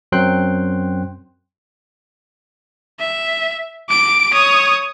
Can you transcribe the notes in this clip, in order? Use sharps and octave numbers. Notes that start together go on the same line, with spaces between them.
F#2 F#3 C4 G5 C6 F#6
E5
D6 D7
C#5 D#6